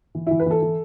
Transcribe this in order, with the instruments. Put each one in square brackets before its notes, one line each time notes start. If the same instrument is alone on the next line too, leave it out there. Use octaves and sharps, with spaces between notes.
[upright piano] E3
E3 E4
B4
E3 A4
E3